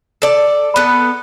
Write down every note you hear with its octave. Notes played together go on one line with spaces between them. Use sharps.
A4 D5
B3 A4